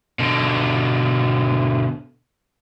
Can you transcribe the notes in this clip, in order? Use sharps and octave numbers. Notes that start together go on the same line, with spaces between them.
B2 D3